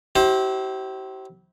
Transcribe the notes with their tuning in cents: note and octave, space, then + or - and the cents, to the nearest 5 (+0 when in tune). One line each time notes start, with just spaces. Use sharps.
E4 -20 G4 -40 C5 +20